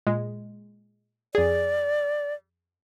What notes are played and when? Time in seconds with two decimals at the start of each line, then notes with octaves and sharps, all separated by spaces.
0.07 A#2 G#3
1.35 F2 G#4 D5